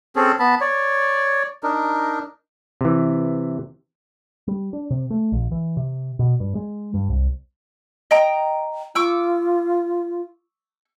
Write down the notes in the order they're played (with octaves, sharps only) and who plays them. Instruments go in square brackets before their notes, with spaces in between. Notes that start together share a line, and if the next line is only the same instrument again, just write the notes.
[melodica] C4 C#4 G#4 A4
B3 A5 B5
C#5 D5
D4 D#4 A#4
[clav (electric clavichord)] C3 E3
[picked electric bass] G3
D4
C3
A3
A#1
E3
C3
B2
G2
G#3
G2
C2
[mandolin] D#5 G5 A#5
[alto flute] F4 [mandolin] C#6 D6 E6